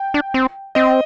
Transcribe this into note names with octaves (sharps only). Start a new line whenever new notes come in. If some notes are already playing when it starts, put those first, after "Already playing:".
Already playing: G5
D4
C4
C4 D#5